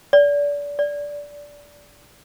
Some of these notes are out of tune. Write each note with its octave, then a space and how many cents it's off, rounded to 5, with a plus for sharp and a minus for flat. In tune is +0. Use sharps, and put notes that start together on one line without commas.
D5 -30
D5 -15